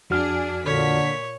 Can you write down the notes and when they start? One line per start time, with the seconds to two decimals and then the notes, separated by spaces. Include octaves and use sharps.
0.10 F2 D4 F#4 G#4 F6
0.66 A#2 D3 C#5 B6